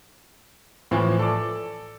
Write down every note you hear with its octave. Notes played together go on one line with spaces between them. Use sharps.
A2 E3 F3
A4 D5 D6